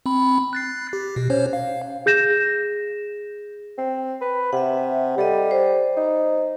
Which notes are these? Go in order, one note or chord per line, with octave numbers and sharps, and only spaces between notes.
C4 B5
F#6 A6 C7
G4
B2
C#4 C5 C#5
F5
G#4 G6 A#6 E7
C4
B4
C3 E5 F#5
G3 G4 A4 D#5
C5
D#4